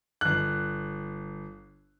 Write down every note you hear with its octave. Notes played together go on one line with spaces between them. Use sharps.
G1 F#6